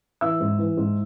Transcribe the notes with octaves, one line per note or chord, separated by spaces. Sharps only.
E3 E5 E6
G#2
E3
G#2